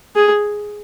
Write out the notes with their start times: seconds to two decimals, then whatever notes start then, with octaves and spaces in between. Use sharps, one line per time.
0.15 G#4